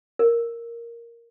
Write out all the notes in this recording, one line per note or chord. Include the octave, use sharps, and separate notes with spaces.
A#4